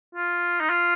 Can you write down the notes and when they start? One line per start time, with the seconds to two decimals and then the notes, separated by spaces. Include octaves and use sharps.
0.15 F4
0.60 D#4
0.69 F4